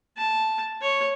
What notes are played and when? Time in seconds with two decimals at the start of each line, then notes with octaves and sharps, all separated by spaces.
0.17 A5
0.81 C#5